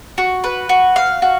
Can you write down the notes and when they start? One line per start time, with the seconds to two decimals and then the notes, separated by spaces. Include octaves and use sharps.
0.18 F#4
0.44 B4
0.69 F#4
0.96 F5
1.22 F#4